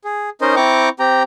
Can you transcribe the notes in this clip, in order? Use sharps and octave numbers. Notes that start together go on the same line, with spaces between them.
G#4
C#4 D#4 A#4 C5 D#5
C4 E4 G5 A#5 C#6 D6
C4 G4 G5 A#5